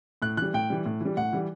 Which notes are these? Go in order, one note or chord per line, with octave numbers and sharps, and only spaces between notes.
A2 F#6
E3 G3 F#6
A2 G5
E3 G3
A2
E3 G3
A2 F#5
E3 G3